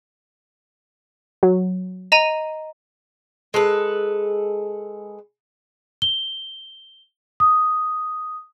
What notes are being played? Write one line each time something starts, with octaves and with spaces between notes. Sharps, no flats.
F#3
D#5 A#5 D#7
G#3 A4 B4
G7
D#6